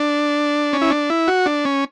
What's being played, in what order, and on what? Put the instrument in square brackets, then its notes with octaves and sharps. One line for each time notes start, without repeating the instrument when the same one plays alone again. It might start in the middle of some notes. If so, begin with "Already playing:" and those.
Already playing: [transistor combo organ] D4
C#4
E4
D4
E4
F#4
D4
C#4